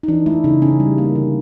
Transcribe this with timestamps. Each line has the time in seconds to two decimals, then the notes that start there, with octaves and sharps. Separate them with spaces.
0.03 D#4
0.08 E3 D4
0.26 A3 E4
0.44 C#3 D#4
0.62 C#3 C#4
0.80 G3
0.98 A#3
1.15 D3